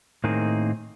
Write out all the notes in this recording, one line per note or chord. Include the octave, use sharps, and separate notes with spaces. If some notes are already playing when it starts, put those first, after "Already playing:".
A2 D#3 A#3 C4 D#4 G#4